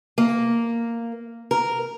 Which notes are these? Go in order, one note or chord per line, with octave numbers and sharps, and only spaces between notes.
A#3
A#4